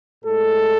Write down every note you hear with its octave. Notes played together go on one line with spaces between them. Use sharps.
A2 G#3 A4